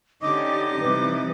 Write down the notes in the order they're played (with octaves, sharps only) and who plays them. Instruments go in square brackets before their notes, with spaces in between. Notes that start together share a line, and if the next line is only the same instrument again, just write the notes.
[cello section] D3 C#4 G4 [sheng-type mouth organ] D#4 D#5 [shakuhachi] D6
[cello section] C3 E3 G3 [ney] B4